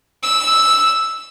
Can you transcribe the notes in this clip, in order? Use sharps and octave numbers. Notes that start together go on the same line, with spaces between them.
E6